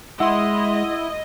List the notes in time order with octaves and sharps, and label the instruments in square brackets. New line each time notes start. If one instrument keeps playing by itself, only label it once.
[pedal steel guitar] G#3 [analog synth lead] E4 [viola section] D#5 [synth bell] F#5 C6